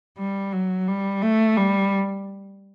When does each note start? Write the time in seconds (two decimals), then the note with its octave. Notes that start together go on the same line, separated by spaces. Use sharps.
0.18 G3
0.53 F#3
0.87 G3
1.22 A3
1.57 G3